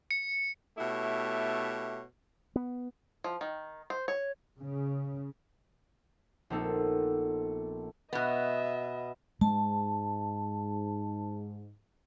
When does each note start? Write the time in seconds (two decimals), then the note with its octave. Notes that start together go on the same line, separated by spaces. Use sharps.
0.11 C#7
0.78 B2 A3 E4 G4 C#5
2.56 B3
3.24 F3
3.41 D#3
3.90 C5
4.08 C#5
4.60 C#3
6.50 A#1 B3 C4 D#4 A4
8.13 B2 B3 D#5 E5
9.41 G#2 G#3 A5